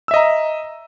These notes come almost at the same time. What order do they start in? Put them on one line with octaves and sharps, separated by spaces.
E6 E5 D#5 A#5